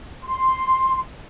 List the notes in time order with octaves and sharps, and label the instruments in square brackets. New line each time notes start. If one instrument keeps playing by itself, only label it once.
[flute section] C6